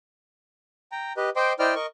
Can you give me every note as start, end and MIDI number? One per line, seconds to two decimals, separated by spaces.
0.92 1.13 79
0.92 1.13 82
1.17 1.30 67
1.17 1.30 71
1.17 1.30 75
1.36 1.53 72
1.36 1.53 75
1.36 1.53 79
1.36 1.53 84
1.36 1.53 86
1.59 1.74 64
1.59 1.74 72
1.59 1.74 74
1.59 1.74 75
1.59 1.74 79
1.59 1.74 89
1.75 1.86 70
1.75 1.86 75
1.75 1.86 85